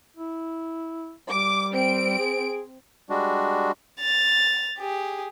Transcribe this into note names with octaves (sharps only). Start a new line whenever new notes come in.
E4
G3 D6
C4 D7
G#4
G3 G#3 D4 F#4
A6 F7
G4 G#4